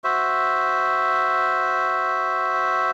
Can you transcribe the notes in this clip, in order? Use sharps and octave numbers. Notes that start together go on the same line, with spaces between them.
F#4 C5 E5